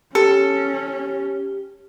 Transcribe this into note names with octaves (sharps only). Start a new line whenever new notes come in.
C#4 G4 A4